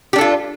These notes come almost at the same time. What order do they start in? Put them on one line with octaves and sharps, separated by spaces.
G4 D4 A4 F4